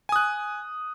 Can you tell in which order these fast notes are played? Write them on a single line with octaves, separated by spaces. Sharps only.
G#5 D#6 F#6